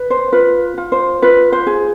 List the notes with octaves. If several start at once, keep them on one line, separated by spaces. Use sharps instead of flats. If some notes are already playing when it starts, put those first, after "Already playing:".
Already playing: B4
C5
F4 B4
F4
C5
F4 B4
C5
G#4